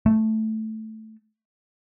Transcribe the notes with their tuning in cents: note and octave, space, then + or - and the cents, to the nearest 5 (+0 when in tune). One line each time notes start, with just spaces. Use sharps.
A3 +0